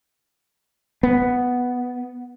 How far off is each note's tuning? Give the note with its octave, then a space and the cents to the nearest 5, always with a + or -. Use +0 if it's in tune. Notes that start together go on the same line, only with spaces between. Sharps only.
B3 +0